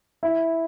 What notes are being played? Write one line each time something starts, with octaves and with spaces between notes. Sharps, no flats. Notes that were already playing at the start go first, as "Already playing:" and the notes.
E4